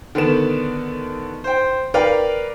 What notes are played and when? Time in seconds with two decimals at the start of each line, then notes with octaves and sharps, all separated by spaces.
0.15 D3 D#3 B3 E7
1.44 C5 G5
1.94 A#4 B4 D5 F5 G5